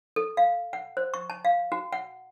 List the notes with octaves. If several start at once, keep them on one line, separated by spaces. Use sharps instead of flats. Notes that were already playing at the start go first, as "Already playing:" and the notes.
A4
F5
F#5
C5
C#6
A5
F5
F#4
F#5